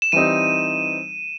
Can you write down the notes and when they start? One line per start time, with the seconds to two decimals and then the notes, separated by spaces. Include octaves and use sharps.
0.02 E7
0.12 E3 G3 C4 D#4 D#7